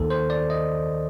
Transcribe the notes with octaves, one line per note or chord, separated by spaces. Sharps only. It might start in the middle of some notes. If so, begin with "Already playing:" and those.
Already playing: D#2 D#3 A4
C5
D5
D#5